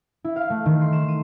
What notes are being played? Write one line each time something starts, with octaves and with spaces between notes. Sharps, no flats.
E4
F5
A3
D#3
C6
E7
D#7